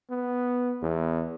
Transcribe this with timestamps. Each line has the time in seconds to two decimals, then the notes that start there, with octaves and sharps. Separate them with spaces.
0.10 B3
0.83 E2